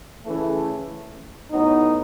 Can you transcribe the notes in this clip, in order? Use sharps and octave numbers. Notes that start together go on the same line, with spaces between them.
C#3 E3 A3
A2 F#3 B3 D#4